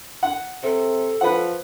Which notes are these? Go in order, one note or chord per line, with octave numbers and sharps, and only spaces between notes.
F#5
C3 A4
F3 B4 F#5